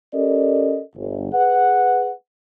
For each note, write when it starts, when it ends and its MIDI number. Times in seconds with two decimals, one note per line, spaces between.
0.13 0.79 61
0.13 0.79 67
0.13 0.79 69
0.13 0.79 70
0.13 0.79 74
0.13 0.79 75
0.95 1.29 31
1.32 2.10 68
1.32 2.10 71
1.32 2.10 78